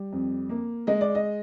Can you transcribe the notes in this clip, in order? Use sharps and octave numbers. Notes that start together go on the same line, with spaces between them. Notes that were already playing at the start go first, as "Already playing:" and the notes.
Already playing: G3
F2
A#3
G#3 D#5
D5
D#5